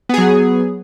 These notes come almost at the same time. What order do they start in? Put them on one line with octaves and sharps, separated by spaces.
B3 G#4 F#3